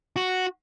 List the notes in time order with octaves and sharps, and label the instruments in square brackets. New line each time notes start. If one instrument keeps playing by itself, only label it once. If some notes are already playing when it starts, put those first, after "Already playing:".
[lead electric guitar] F#4